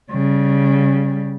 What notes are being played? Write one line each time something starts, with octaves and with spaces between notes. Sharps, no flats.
C#3 G3